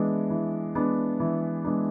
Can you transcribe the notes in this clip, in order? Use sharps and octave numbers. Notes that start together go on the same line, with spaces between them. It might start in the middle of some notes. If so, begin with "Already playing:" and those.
Already playing: E3 G#3 B3 D4
E3
G#3 B3 D4
E3
G#3 B3 D4